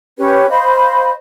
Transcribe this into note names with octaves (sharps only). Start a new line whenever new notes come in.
C#4 G4 B4 C#5
C5 D#5 F5 B5